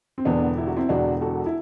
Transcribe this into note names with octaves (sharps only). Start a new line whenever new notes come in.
C4
E1 E2 D3 B3 D4
E4
F#4
C4 E4
E1 E2 D3 D4 F#4
F#4 A4
E4